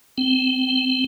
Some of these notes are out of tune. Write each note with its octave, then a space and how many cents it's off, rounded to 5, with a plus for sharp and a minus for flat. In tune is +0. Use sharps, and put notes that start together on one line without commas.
C4 -20